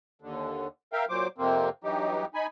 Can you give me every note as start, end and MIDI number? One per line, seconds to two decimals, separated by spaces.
0.22 0.67 39
0.22 0.67 50
0.93 1.05 70
0.93 1.05 76
0.93 1.05 77
0.93 1.05 79
1.09 1.27 46
1.09 1.27 54
1.09 1.27 72
1.09 1.27 86
1.38 1.69 41
1.38 1.69 48
1.38 1.69 58
1.38 1.69 60
1.84 2.25 43
1.84 2.25 52
1.84 2.25 54
1.84 2.25 63
1.84 2.25 67
2.34 2.47 63
2.34 2.47 80
2.34 2.47 83